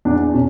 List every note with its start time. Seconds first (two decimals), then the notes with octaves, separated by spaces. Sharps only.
0.05 E2 D4
0.33 B2 C#4